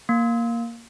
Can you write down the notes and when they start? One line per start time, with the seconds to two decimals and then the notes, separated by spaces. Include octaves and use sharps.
0.09 A#3